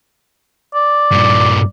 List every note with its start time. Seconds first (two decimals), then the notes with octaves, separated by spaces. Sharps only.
0.75 D5
1.11 G2 A#2